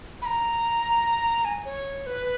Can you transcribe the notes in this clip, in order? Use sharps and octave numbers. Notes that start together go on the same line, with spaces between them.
B5
A#5
G#5
C#5
B4